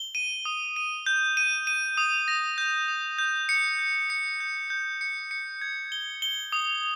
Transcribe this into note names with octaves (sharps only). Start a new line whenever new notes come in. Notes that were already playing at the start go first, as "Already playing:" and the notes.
Already playing: G7
D#7
D#6
D#7
G6
D#7
D#7
D#6
A#6
G6
D#6
G6
C#7
G6
C#7
G6
G6
C#7
C#7
G#6
G7
G7
D#6